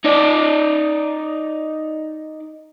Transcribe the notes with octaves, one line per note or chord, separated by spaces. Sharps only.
D#4 D5